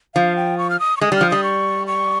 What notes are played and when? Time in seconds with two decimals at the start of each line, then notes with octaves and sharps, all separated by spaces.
0.15 F3 F5
0.36 G5
0.58 C#6
0.70 F6
0.80 D#6
0.97 C#6
1.01 G#3 D#6
1.12 G3 F6
1.21 F3
1.30 G3 D#6
1.43 C#6
1.87 C#6